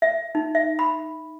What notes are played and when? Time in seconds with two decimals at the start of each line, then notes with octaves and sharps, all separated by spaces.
0.02 E5
0.35 D#4
0.55 E5
0.79 B5